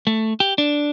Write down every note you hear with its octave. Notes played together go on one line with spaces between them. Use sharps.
A3
G4
D4